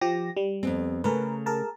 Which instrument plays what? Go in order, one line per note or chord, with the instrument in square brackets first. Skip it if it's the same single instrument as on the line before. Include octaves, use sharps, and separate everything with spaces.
[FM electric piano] F3 G4 A#6
G3
[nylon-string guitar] F2 B3 C4
[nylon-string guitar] C#3 A3 [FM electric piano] A#4 B4
[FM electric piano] G#4 A#4 A5